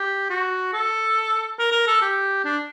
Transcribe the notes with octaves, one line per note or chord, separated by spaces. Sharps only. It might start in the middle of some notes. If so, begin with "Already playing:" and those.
Already playing: G4
F#4
A4
A#4
A#4
A4
G4
D4